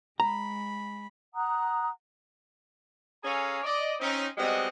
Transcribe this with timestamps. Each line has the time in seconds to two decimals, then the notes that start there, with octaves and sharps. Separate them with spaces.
0.20 G#3 A#5 B5
1.35 F#5 A#5 D#6 F#6
3.24 C#4 G#4 A4 C#5 F5 A#5
3.64 D5 D#5
4.00 C4 C#4 D#4
4.37 G3 G#3 B3 C4 F#4 D#5